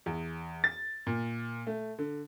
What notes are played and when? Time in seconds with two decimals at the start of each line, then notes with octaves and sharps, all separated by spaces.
0.06 E2
0.64 A6
1.07 A#2
1.67 A3
1.99 D3